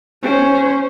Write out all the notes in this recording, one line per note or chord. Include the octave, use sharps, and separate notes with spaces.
C#4 C5